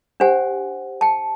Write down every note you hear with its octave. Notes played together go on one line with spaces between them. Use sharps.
D4 G4 C5 F#5 G#5
G5 A5